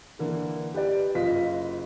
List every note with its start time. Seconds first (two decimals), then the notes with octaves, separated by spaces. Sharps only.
0.19 D3 E3 A#3
0.74 G4 B4 D5
1.15 F#1 F4 D#5 B6